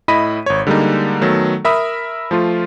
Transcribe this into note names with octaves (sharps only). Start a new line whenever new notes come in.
A2 E4 D#5 B5 B6 D#7
G#1 C#5
D3 G3 G#3 A#3 D#4
D#3 F#3 A3 B3 A4
A#4 E5 B5 D#6
F3 A3 F4